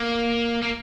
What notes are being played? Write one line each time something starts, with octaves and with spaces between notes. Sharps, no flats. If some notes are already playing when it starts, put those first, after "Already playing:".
Already playing: A#3
A#3